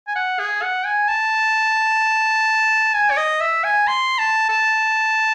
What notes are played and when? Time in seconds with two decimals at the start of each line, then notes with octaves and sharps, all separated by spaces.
0.07 G#5
0.16 F#5
0.39 G#4
0.62 F#5
0.85 G#5
1.08 A5
2.94 G#5
3.10 C#5
3.17 D#5
3.41 E5
3.64 G#5
3.87 C6
4.18 A5
4.49 A5